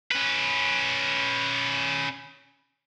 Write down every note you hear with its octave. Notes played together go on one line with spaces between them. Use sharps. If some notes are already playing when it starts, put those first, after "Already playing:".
C#4 B4